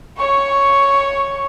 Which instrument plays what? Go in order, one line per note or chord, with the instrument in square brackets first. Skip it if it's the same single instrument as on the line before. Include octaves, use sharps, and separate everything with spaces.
[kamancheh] C#5 C#6